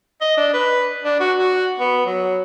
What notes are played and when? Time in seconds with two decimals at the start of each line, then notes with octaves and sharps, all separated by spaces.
0.21 D#5
0.37 D4
0.53 B4
1.04 D4
1.20 F#4
1.39 F#4
1.80 B3
2.06 F#3